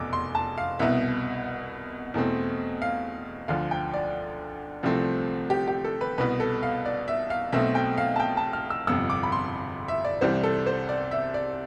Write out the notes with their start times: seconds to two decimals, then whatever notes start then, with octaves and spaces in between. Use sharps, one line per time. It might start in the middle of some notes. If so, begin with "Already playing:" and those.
Already playing: F1 E2 B2 D6 E6
0.13 C6
0.35 A5
0.58 F5
0.79 C2 B2 B3 E5
2.14 E2 B2 A3 C4
2.82 F5
3.48 D2 D3 F3 F5
3.71 G5
3.94 D5
4.83 C2 C3 F3 A3 C4
5.50 G4
5.68 G4
5.85 A4
6.01 B4
6.18 C2 B2 B3 B4
6.40 A4
6.63 F5
6.85 D5
7.08 E5
7.30 F5
7.52 B1 B2 A3 C4 E5
7.75 G5
7.98 F5
8.16 A5
8.20 G5
8.37 A5
8.53 F6
8.70 E6
8.87 G1 F2 C3 E6
9.10 D6
9.23 B5
9.32 C6
9.88 E5
10.05 D5
10.21 C2 C3 E3 G3 C5
10.43 A4
10.66 C5
10.89 D5
11.11 E5
11.34 D5